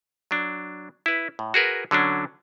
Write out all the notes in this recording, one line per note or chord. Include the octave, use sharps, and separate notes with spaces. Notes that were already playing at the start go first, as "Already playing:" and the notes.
F#3 D4
E4 B4
A2
F#4 G#4 A#4 B4
D3 F#3 C#4 D4